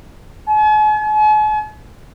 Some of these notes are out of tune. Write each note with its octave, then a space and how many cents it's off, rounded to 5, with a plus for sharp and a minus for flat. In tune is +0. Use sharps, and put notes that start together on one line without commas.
G#5 +45